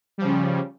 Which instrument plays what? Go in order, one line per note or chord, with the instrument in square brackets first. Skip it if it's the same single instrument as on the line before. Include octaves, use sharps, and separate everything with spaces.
[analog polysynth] G3
F3
C#3
C#4